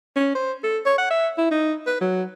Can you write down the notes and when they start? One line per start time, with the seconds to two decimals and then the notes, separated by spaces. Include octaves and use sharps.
0.16 C#4
0.35 C5
0.63 A4
0.85 C#5
0.98 F#5
1.10 E5
1.38 E4
1.51 D#4
1.86 B4
2.01 F#3